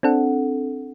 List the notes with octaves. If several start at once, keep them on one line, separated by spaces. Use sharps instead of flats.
C4 D4 A4 F#5